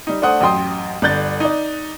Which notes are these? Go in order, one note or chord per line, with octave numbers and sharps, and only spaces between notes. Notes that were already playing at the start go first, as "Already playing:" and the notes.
G3 D#4
A3 D4 C5 F#5 D#6
A1 F#2 G5 C6 D#6
G1 D3 F#6 G6 A6
D#4 D5